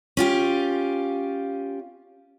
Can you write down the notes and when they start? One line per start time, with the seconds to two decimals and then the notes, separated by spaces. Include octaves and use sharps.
0.17 C#4 F4 G4